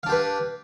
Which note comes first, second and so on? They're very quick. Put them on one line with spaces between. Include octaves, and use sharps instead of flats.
F5 D4 G4 B4